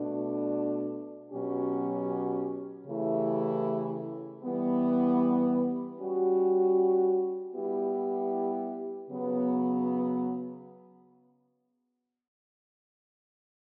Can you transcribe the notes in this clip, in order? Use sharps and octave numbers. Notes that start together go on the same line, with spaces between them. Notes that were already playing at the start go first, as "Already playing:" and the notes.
Already playing: B2 A3 D4
B2 F#3 C#4 G4
C#3 E3 A3 E4 G4
E3 G3 B3
G3 C#4 F#4
G3 B3 E4 G4
C#3 F#3 B3